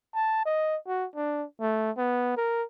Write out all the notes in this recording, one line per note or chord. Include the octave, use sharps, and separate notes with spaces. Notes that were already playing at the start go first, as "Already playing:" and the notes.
A5
D#5
F#4
D4
A3
B3
A#4